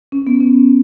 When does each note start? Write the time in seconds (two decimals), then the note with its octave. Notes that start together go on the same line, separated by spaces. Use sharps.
0.12 C#4
0.27 B3
0.40 C#4